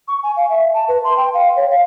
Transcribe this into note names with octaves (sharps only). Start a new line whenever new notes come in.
C#6
G#5
F5
E5
A5
B4
C6
G5
F5
C#5
F5